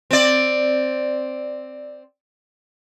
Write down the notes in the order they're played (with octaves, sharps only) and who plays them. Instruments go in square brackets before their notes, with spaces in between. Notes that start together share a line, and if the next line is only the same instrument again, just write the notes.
[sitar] C4 D5